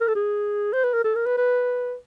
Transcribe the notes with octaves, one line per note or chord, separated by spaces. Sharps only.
A#4
A4
G#4
C5
B4
A#4
A4
A#4
B4
B4